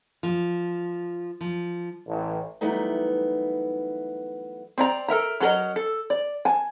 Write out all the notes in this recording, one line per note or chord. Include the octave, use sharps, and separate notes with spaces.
F3
F3
A1
E3 F#3 G3 A3 B3 D#4
C4 D5 A#5
A4 A#4 E5 A#5
F#3 C#4 A4 A#4 D#5
A4
D5
G#5 A5